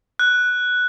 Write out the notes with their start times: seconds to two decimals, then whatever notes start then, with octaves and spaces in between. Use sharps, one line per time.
0.19 F#6